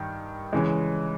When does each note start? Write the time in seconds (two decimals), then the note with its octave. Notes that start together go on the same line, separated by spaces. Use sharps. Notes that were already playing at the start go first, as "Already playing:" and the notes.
Already playing: G2 D#3
0.53 C#3 E3 G#3